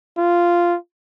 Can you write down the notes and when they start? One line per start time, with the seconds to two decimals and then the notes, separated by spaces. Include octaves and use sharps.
0.18 F4